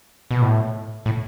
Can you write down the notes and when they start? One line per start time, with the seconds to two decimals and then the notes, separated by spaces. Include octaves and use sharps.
0.31 B2
0.42 A2
1.06 A2